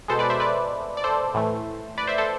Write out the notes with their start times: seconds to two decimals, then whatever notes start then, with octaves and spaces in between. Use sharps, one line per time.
0.08 B2 G#3 A4 C5
0.19 B4 D5
0.30 C5 E5
0.40 B4 D5
0.97 D5
1.04 A4 C5
1.34 A2 E3 A3
1.98 B4 D5
2.07 C5 E5
2.18 A4 C5